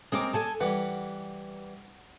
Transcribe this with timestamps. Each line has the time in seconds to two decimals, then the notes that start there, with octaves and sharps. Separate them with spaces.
0.12 G#3 C4 G#4 A#4 D6
0.33 A4 G#5 A5
0.61 E3 G3 F#5